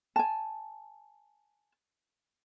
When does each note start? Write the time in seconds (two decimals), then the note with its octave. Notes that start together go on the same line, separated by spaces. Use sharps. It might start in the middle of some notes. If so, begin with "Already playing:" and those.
0.16 G#5 A5